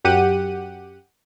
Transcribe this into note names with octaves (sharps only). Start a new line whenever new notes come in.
F#2 G4 F#5 D#7